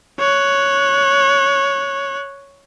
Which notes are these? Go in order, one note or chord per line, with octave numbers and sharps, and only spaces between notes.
C#5 F#6